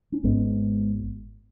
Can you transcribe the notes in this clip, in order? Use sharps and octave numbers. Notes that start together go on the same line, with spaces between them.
C#4
G#1 G#2 G#3 B3